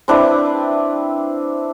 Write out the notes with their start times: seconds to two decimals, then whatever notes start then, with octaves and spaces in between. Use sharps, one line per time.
0.08 C4 D4 E4 B4